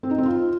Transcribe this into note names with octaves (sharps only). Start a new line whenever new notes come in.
C4
D#4
C4
F4